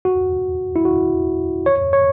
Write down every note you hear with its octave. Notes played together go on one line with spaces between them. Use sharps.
F#4
E4
F#4
C#5
C#5